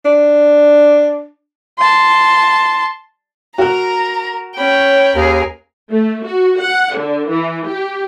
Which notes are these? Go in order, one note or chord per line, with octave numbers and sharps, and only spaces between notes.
D4
A5 C6
F#4 A#4 A#5 F#6
C#4 C#5 G5 B5
D#2 G#4 A#4
A3
F#4
F#5
D3
E3
G4